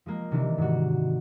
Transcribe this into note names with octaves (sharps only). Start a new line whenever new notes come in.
F3 G#3 A#3
C3 D#3 E3 D4
G#2 F#4